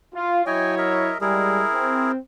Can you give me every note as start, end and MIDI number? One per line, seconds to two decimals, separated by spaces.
0.15 0.41 65
0.46 1.13 54
0.46 1.13 64
0.46 1.13 73
0.46 0.75 75
0.46 0.75 79
0.46 0.75 80
0.78 1.18 70
0.78 1.18 75
0.78 1.18 76
1.21 1.64 55
1.21 1.64 56
1.21 2.12 64
1.21 2.12 68
1.21 2.12 70
1.74 2.18 60